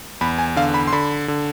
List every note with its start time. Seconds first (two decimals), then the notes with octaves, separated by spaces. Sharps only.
0.21 E2 B5
0.39 G#5
0.56 D3 F5
0.74 B5
0.88 C6
0.93 D3 B5
1.28 D3